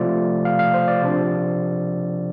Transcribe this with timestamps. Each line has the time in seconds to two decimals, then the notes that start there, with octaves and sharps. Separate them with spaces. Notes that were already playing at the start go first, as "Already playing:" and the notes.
Already playing: C3 F3 A3 F4 D5
0.45 F5
0.59 F5
0.74 C5
0.88 D5
1.02 C3 F3 D4